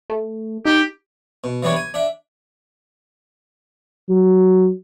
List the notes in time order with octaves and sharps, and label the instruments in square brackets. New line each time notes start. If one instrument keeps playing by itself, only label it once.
[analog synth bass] A3
[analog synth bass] D#4 [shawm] G4
[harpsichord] B2
E3 G3 B3 D4 C#5
G#5
D4 E5
[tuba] F#3